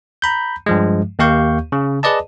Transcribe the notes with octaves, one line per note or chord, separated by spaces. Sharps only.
A#5 B5 G6
G2 F3 G#3
D#2 A#3 G4 F5 C#6 G6
C#3
G#4 B4 D5 D#5 A5